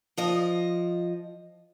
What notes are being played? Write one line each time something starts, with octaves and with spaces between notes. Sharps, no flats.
F3 D#5